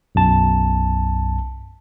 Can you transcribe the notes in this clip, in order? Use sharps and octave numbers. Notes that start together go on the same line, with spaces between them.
B1 F#2 A5